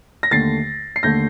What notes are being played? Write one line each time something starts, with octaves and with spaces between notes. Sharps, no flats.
A#6
D#2 D3 A3 A6 C7
C7
D#2 D3 A3 G6 A#6